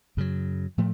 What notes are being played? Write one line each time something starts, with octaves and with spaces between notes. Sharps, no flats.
F#2 C#3 F#3
A2 F3 A3